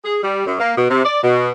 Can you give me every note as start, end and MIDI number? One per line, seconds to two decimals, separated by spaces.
0.05 0.20 68
0.23 0.44 55
0.46 0.58 42
0.59 0.73 58
0.77 0.88 47
0.89 1.05 48
1.05 1.18 74
1.22 1.51 47